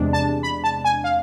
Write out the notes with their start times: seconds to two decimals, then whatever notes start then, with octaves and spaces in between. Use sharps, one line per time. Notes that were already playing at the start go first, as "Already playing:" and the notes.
Already playing: E2 C3 G#3 D4
0.13 A5
0.43 B5
0.64 A5
0.85 G#5
1.04 F5